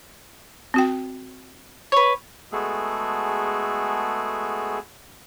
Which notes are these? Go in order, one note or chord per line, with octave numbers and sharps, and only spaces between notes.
C4 F#4 G5
B4 C#5
G#3 A3 B3 F#4 G#4 A4